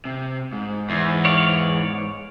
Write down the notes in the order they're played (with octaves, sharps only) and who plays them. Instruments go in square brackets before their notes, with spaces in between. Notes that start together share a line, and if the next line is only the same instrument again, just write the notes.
[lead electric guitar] C3
G#2
[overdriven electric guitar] E2
[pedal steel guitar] C#5 D5 F5